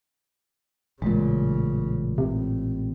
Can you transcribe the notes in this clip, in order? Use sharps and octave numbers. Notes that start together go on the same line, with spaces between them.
A1 A#2 C#3 G#3
A2 C3